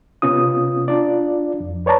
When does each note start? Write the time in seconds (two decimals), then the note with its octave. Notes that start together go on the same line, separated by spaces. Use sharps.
0.22 C3 B3 C#4 F4 D#6
0.88 D4 F4 D5
1.60 F2
1.86 B4 C#5 D5 A5 A#5